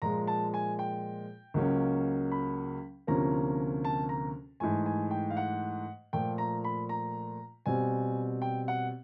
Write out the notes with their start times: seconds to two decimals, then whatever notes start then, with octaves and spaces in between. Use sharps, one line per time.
0.02 A#2 F3 G#3 A#5
0.27 A5
0.54 G#5
0.79 G5
1.54 C#2 C#3 F#3 A#3 C#4
2.32 B5
3.07 D2 C3 F3 A#3 C#4 A#5
3.85 A5
4.09 A#5
4.60 G#2 E3 A3 G#5
4.86 G#5
5.11 G5
5.30 F5
5.37 F#5
6.13 A#2 F3 A3 G5
6.38 A#5
6.64 B5
6.89 A#5
7.66 B2 G3 C4 G#5
8.42 G5
8.68 F#5